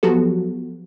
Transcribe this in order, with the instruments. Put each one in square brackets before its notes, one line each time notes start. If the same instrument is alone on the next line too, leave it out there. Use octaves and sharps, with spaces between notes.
[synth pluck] F3 F#3 B3 F#4 G4 A4